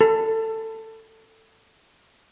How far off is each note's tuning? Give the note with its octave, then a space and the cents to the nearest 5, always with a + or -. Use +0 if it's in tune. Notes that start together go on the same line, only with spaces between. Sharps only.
A4 +15